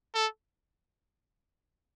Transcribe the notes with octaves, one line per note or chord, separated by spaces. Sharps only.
A4